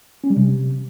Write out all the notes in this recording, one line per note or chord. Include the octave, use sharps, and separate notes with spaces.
C#4
G3
C3